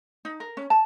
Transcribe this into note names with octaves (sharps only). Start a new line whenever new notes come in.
D#4
A#4
C#4
A5